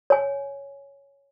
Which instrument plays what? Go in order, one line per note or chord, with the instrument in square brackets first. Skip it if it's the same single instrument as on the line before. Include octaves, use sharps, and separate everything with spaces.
[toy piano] C#5 G#5